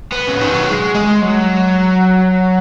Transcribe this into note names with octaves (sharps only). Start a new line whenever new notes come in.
B3
C#3
D#3
F#3
G#3
G#3
F#3